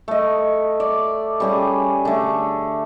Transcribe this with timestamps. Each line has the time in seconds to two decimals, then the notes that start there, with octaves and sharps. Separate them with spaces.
0.08 A3 D#5
0.80 D5
1.40 G3 C#4 G#4
2.05 D3 A3